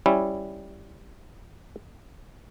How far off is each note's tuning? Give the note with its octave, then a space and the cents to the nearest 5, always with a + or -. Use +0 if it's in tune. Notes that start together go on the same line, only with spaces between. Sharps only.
G3 +0 C#4 -5 E4 +0